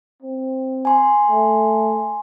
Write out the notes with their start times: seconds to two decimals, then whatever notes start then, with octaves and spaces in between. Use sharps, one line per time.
0.22 C4
0.85 G#5 C6
1.30 A3